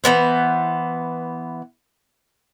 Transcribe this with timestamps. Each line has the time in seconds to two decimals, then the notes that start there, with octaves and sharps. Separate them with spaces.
0.04 E3 F#3 B3 C5